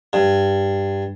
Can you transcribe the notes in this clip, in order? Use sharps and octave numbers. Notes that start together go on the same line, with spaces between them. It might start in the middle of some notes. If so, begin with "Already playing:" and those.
G2